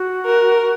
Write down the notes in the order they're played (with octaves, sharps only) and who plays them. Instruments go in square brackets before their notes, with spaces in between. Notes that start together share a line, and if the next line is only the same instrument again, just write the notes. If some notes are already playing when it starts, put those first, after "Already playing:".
Already playing: [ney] F#4
[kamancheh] A#4